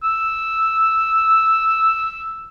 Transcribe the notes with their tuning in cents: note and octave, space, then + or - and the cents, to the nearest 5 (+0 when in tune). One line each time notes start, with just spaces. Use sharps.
E6 +0